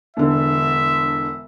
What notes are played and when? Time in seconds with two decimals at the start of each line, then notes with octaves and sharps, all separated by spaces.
0.17 E1 D3 E5